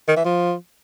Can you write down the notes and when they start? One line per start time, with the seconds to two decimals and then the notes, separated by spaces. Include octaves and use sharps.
0.08 D#3
0.17 E3
0.25 F3